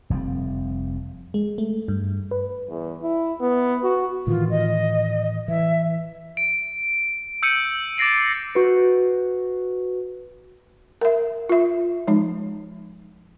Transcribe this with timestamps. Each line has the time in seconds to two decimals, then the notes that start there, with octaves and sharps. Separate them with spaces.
0.10 F1 F3 G3 C4
1.34 G#3
1.58 A3
1.88 G2
2.31 B4
2.69 E2
3.02 E4
3.41 B3
3.83 F#4
4.27 A2 D#3 E3 F4
4.50 D#5
5.48 E3 E5
6.37 D7
7.43 E6 G6 C#7 D#7
7.98 D6 A6 A#6 C7 D7
8.55 F#4 B4
11.01 A#4 E5
11.49 F4 E5
12.08 F3 G#3 D#4